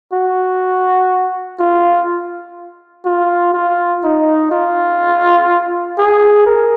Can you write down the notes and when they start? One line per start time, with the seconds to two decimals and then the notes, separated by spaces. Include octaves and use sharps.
0.13 F#4
1.59 F4
3.05 F4
3.54 F4
4.03 D#4
4.51 F4
5.98 G#4
6.46 A#4